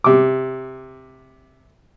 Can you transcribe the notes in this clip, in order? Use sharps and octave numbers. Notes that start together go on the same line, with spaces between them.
C3 D6